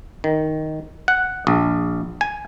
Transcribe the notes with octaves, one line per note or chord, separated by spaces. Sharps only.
D#3
F#5
A#1
G#5